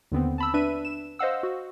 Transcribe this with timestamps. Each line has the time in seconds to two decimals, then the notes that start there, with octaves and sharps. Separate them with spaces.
0.12 D#2 D3 B3 C4
0.38 A5 B5 E6
0.54 D4 B4 E5 D#7
0.85 E7
1.19 C5 D#5 F5 F#5 E6
1.43 F#4